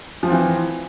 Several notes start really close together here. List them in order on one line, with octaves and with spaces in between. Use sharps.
F3 C4 E3